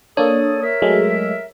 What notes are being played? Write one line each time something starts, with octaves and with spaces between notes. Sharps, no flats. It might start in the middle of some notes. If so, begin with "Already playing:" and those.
A#3 D4 A4 C#5 D#6
A#4 E5
F#3 G#3 A3